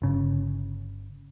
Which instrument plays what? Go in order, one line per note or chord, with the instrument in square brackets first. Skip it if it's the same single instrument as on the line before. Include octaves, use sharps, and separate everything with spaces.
[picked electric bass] G1 C#3